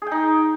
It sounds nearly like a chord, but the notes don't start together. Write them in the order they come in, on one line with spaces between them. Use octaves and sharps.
G#4 G5 D#4